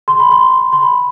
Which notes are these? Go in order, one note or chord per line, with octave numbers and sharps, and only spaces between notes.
C6
B5
C6
C6
B5